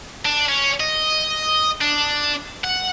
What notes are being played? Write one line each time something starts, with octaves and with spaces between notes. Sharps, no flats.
D4
C#4
D#5
D4
F#5